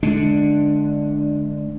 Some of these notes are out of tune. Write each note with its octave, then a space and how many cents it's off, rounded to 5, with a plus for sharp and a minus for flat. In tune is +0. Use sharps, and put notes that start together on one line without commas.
D3 +10 G#3 +30 D4 +0